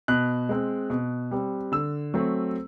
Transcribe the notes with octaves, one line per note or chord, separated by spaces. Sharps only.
B2 F#6
G#3 C4
B2
G3 C4
D3 E6
F#3 A3 C4